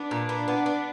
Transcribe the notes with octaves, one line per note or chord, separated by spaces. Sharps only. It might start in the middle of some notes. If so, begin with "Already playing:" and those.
Already playing: B3 D4
A#2
B3
B3
B3